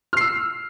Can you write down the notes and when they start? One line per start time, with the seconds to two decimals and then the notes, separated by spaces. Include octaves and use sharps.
0.13 F6
0.17 C7
0.21 E6